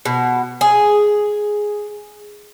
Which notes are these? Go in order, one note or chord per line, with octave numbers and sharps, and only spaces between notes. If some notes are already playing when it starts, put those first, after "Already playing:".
B2
G#4